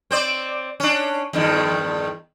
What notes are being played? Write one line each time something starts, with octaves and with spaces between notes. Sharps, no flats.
C4 C5 D5
C#4 D4
E2 G2 D#3